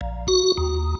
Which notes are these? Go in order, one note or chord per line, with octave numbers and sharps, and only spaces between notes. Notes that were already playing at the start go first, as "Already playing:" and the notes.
A#1
F#4
D#2